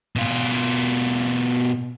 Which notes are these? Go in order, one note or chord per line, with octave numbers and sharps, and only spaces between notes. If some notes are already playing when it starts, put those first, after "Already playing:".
B2 F4